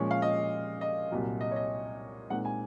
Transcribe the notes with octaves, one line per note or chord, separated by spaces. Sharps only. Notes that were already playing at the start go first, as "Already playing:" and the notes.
Already playing: A#2 F3 G#3 C#4
F5
D#5
D#5
C2 A#2 F#3
D#5
C#5
D#5
A#2 G#3 C4 D#4 F#5
G#5